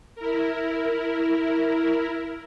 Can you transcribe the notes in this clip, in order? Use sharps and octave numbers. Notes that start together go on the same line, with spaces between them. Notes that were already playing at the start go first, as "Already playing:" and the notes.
E4 A#4